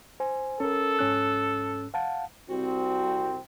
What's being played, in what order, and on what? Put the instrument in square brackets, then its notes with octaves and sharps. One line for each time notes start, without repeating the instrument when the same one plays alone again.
[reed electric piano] C5 G#5
[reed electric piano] C#4 A#4 [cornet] A4
[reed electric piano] G#2 C#4 F#6
F5 F#5 A5
[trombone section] C2 C4 [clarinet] F#4